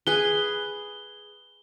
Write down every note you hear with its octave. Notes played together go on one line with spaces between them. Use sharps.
G#4 B4 G7